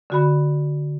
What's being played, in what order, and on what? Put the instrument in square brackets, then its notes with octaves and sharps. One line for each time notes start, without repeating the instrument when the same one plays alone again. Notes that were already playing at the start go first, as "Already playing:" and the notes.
[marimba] D3 F#4 B5